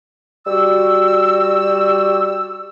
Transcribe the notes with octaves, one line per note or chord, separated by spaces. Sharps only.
G3 F#4 E6